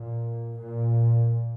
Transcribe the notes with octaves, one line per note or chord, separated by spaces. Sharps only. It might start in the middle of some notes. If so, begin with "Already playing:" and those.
Already playing: A#2
A#2